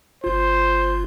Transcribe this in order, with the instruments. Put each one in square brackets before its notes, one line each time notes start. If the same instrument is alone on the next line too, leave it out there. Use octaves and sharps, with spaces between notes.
[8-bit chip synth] G1 F4 [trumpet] C5